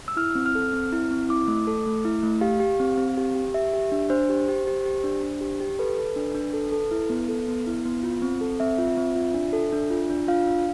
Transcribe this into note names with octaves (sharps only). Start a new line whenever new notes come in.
E6
E4 F6
C4
F6
A4
C4
E4
C4
E4 D6
A3
A4
A3
E4
A3
G4 F5
G4
C4
C4
G4
G4
G4 E5
G4
D4
D4 C5
G4
G4
G4
G4
D4
D4
G4
G4
A4 B4
A4
D4
D4
A4
A4
E4
B3
A4
B3
E4
B3
F4
C4
A4
C4 E5
F4
C4
F4
D4
A4
D4
F4
D4
F4 F5
D4